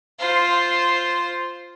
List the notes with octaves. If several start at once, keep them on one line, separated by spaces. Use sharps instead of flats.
F4 C5